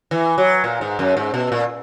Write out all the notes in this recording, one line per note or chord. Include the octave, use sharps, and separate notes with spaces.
E3
F#3
A#2
G#2
F#2
G#2
B2
A#2